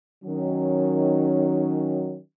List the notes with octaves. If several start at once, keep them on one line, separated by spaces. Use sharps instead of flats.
D#3 F#3 C#4